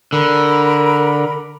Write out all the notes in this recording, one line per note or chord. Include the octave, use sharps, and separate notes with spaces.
D3 A#4 B5